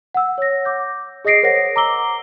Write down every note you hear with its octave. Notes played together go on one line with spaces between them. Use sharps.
F#5 E6
C#5 A#6
D6 G6
G#4 D#5 D#6 A#6 C7 D7
A#4 C5 C#5 F#5 A#6 C7
A#5 D6 E6 G7